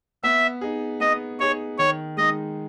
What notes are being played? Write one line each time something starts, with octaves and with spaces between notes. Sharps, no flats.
B3 E5
D#4 G#4
B3 D#5
D#4 G#4 C#5
D#3 C#5
G#3 D#4 D#5